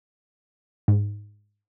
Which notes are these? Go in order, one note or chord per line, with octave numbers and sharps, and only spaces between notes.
G#2